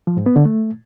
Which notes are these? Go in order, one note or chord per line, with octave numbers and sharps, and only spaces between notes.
F3
G#2
B3
D3
A3